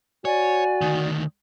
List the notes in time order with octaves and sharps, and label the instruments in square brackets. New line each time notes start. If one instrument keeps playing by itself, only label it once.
[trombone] F#4 [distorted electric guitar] C#5 [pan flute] D5 [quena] G#5
[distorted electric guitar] D2 D#3